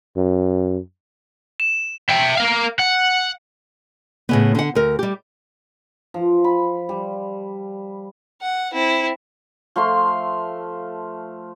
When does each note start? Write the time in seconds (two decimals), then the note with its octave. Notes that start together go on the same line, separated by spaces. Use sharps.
0.17 F#2
1.60 E7
2.09 E5 G5
2.37 A#4 F5
2.79 F#5
4.29 A2 C#3 B3
4.55 D3 F#5
4.75 D2 A#4
4.99 G3 G4
6.14 F3
6.44 B5
6.89 G3
8.42 F#5
8.73 C4 E4
9.76 F3 A3 F5 C6